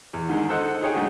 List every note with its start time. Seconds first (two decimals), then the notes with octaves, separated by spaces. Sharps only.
0.13 E2
0.29 D3 D#3 G#3
0.49 A4 C5 D#5 F#5
0.81 D#4 G#4 C#5 G5
0.94 D3 F#3 G#3 A3 D#4